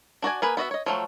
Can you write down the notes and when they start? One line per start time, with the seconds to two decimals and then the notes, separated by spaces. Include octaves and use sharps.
0.22 D4 F#4 D5 G#5
0.42 A#3 G#4 B4
0.57 B3 F#4 D#5 E5
0.71 C#5 D#5
0.86 F3 F#3 A3